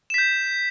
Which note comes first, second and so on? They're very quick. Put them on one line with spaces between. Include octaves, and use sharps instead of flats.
E7 B6 G6